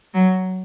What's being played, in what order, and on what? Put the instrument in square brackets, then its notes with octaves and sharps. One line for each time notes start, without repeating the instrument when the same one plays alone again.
[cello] F#3